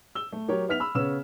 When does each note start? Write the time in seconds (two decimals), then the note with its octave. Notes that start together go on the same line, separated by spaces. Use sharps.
0.15 E6 G7
0.32 A3
0.48 F#3 G4 A#4 C#5
0.68 B3 D#4 E5 F6 B6 F7
0.80 B5 E6
0.95 C#3 B3 C#4 E6 E7